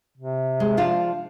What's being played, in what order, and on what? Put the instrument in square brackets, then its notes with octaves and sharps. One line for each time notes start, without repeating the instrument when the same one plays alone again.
[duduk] C3
[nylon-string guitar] G#3
F3 D4 F4